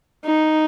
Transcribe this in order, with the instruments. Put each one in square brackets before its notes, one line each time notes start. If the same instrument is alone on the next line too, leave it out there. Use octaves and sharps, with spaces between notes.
[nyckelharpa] D#4